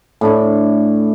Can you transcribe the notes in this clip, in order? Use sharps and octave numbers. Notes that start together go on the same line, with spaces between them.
A2 D4 E4